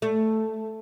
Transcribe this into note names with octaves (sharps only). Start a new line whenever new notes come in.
A3